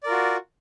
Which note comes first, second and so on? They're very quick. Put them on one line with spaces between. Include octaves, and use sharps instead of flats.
D5 A#4 F4 F#4